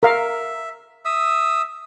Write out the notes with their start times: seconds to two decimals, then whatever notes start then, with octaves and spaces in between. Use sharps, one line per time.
0.03 A#4 E5 F5
1.05 E5 D#6 E6